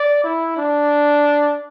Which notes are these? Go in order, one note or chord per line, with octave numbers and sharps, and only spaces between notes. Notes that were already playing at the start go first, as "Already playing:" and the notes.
Already playing: D5
E4
D4